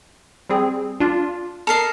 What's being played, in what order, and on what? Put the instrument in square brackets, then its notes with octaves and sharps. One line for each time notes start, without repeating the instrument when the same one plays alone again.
[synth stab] G3 C4 G#4
D4 F4
[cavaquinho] A4 A#4 D#5 [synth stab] A#5 C7